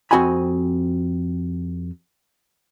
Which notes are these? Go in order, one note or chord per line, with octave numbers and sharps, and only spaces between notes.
F2 C4 F#4 D#5 G#5 B5